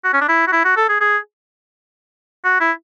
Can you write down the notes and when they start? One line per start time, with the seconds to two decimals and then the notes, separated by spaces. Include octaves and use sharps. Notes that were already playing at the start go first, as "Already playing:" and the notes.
0.05 F#4
0.14 C#4
0.21 D4
0.29 E4
0.47 F#4
0.53 E4
0.65 F#4
0.77 A4
0.89 G#4
1.01 G#4
2.44 F#4
2.60 E4